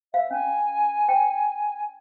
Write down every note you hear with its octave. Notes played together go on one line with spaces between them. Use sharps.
E5 F5
C#4 G#5
G5